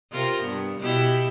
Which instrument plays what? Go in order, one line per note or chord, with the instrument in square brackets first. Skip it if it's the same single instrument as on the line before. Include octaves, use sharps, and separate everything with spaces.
[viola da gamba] C3 F4 A#4
G2 B3
B2 E4 G4